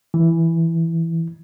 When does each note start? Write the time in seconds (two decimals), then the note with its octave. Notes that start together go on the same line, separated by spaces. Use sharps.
0.14 E3